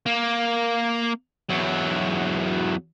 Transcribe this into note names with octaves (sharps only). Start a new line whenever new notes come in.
A#3
E2 F#3